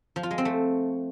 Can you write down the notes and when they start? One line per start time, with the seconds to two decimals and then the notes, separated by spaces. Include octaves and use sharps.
0.16 F3
0.23 F4
0.31 G#3
0.38 C4
0.45 A3